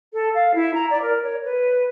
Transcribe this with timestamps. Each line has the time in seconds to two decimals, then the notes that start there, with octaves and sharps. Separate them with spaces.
0.13 A4
0.35 F5
0.54 E4
0.74 A#5
0.90 D5
1.02 A#4
1.23 C#5
1.45 B4